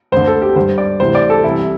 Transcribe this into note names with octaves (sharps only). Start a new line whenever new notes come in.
D2 D3 C5
A4
G4
G2 D3 C5
D5
D2 C3 E3 C5
D5
A4
C2 C3 E3 E4